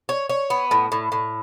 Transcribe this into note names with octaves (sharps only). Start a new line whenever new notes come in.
C#5
C#5
B3
A2
A2
A2